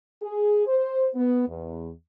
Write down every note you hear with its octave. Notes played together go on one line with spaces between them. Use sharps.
G#4
C5
B3
E2